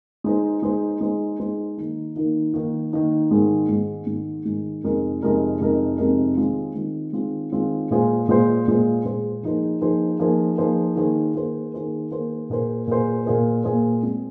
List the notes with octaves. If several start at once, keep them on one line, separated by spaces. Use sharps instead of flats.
G#3 D#4 C5
G#3 D#4 C5
G#3 D#4 C5
G#3 D#4 C5
D#3 A#3 D#4
D#3 A#3 D#4
D#3 A#3 D#4
D#3 A#3 D#4
G#2 D#3 G#3
G#2 D#3 G#3
G#2 D#3 G#3
G#2 D#3 G#3
F2 C3 G#3 D#4 A#4
F2 C3 G#3 D#4 A#4
F2 C3 G#3 D#4 A#4
F2 C3 G#3 D#4 A#4
D#3 G#3 C4 F4
D#3 G#3 C4 F4
D#3 G#3 C4 F4
D#3 G#3 C4 F4
A#2 G#3 F4 G#4 C5
A#2 G#3 F4 G#4 C5
A#2 G#3 F4 G#4 C5
A#2 G#3 F4 G#4 C5
F3 A#3 D#4 G#4 C5
F3 A#3 D#4 G#4 C5
F3 A#3 D#4 G#4 C5
F3 A#3 D#4 G#4 C5
D#3 A#3 G#4 C5
D#3 A#3 G#4 C5
D#3 A#3 G#4 C5
D#3 A#3 G#4 C5
A#2 A#3 G#4 C5
A#2 A#3 G#4 C5
A#2 A#3 G#4 C5
A#2 A#3 G#4 C5
G#3 C4 G#4